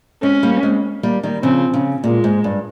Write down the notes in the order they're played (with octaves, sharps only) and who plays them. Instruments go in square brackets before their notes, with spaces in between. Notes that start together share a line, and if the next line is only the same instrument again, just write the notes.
[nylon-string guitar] G#3 C4 [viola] C#4
[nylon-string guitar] G3 A#3
G#3 C4
G3 A#3
D#3 G3
[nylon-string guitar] C#3 F3 [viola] C4
[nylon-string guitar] C#3
[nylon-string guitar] A#2 [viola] G#3
[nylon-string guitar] G#2
G2